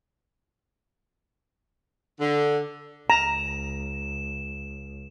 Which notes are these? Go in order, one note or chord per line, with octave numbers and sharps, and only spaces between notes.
D3
C#2 A#5 E7